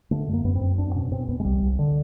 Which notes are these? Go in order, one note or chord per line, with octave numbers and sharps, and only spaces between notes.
D3 A3
F#2
A#3
F#2 B3
C4
F#2
E2 D4
B2 C#4
B2 C4
E2 B3
G#3
C2 G3
C2
D3